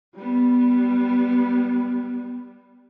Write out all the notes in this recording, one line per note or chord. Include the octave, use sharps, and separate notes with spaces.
G3 B3